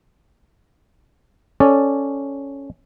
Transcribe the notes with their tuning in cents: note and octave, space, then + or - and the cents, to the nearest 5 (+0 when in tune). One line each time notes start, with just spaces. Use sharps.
C#4 +0 A4 +0 D5 +0